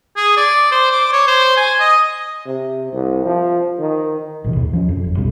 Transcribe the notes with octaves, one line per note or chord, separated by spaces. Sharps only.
G#4
D5
C5
D6
C#5
C5
G#5
D#5
C3
C2
F3
D#3
A1 B2 E3
D#2
F3 C#4
F2
F#1
B1 B2 G3